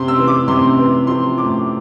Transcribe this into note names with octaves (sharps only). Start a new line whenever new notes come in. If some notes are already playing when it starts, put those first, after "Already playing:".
Already playing: C3 C6
E6
E3
D6
C3 C6
E3
F3 C6
A2 D6